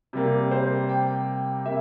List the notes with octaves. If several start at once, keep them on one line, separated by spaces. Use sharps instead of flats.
C3 G3 A#3
C5
G5
C3 A#3 E5